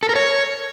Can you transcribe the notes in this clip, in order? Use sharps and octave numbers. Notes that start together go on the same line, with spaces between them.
A4
A#4
C#5